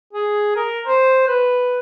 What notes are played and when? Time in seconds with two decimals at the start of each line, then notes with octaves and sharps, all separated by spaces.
0.13 G#4
0.56 A#4
0.87 C5
1.27 B4